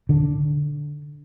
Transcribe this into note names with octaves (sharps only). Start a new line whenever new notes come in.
D3